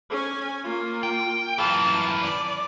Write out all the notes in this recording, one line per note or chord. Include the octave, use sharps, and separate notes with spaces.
C#4 G#5
A#3 F4
G5
F#2 E3 F5 A5
D5